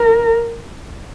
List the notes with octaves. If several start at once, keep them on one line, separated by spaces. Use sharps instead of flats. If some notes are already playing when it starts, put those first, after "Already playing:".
Already playing: A#4